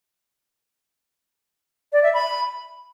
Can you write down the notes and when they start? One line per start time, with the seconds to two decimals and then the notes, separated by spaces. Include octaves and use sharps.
1.92 D5
2.03 E5
2.13 B5